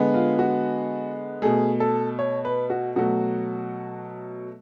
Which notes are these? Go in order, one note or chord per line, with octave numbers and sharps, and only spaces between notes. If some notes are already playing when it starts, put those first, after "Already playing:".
Already playing: D3 G#3 B3
F4
F#4
B2 A3 G#4
A4
C#5
B4
F#4
B2 F#3 A3 F#4